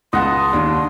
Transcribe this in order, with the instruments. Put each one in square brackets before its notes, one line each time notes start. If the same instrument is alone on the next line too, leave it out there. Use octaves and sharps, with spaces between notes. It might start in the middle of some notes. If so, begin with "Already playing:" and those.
[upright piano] C#2 [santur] D#5 F#5 A5 [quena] C6
[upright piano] D#2 [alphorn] D4